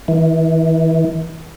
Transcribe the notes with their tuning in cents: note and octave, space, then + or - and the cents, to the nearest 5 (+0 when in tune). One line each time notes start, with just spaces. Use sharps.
E3 -30